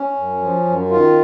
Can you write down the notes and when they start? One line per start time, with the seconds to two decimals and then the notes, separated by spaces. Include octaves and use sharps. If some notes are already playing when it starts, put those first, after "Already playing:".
Already playing: C#4
0.16 F#2
0.41 F3
0.65 F#2
0.89 D#3 F4